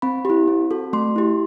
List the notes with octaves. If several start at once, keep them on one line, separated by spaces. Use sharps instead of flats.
C4 B5
E4 G4
C4
F#4 A4
A3 C6
E4 G4